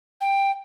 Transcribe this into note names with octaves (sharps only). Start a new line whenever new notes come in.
G5